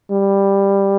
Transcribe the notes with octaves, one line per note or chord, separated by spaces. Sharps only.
G3